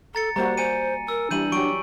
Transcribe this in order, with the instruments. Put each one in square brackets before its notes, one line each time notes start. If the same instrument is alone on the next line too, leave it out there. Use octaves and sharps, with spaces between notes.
[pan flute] A4 [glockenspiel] A#5 A6 C#7
[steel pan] G3 A#3 F#4 [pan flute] C5 [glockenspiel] A#5
[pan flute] C5 [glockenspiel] G#5 C#7 D#7
[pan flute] A#4 [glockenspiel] E6
[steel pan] E3 G3 [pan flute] D4 [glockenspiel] G6 D#7 F#7
[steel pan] F#3 G4 [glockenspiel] C#6 D7